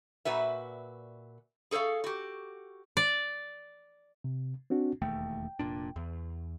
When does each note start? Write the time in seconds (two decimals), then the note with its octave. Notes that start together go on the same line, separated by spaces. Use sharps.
0.25 A#2 F#4 B4 E5
1.71 G#4 A4 C5 C#5 F5
2.04 F#4 G4
2.97 D5
4.24 C3
4.70 C4 D4 F#4
5.02 E1 D#2 A3 G5
5.59 F1 A#2 D4
5.96 E2